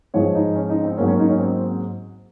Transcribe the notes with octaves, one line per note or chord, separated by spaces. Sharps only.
G#2 F3 G#3 C#5
D#4
C#4
D#4
C4
G#2 F#3 A#3 C#4
C#4
D#4
C#4
C4